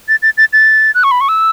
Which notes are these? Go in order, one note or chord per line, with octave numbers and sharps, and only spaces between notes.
A6
A6
A6
A6
F#6
C#6
B5
C#6
E6